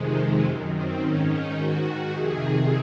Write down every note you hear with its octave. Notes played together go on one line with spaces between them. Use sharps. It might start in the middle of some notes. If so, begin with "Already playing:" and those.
Already playing: F2 C3 D#3 G#3
G#3
F#2 D#3
C4
G#2 D#3 C#4
D#4
G#2 D#3 F#4
F2 C3 D#3 G#4
G#4